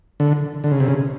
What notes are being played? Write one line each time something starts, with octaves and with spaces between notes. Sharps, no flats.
D3
D3
C#3
C3
C#3